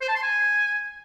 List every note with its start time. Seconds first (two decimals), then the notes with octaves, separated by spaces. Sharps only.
0.01 C5
0.08 A5
0.16 C6
0.23 G#5